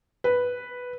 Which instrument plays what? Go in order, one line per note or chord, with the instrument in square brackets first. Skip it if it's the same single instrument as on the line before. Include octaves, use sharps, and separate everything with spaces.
[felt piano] B4